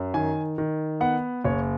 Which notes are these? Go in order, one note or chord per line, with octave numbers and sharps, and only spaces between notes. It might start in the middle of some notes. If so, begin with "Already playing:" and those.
Already playing: F#2
D#3 G#5
D#3
B3 F#5
F#1 C#5